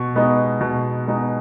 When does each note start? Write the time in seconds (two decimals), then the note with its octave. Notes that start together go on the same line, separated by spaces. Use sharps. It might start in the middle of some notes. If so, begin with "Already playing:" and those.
Already playing: B2 C#6
0.15 G#3 B3 D#4
0.61 B2
1.07 G#3 B3 D#4